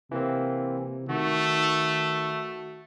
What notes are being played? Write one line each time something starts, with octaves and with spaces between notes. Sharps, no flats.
C3 E3 A#3 C4
D#3 A3 F#4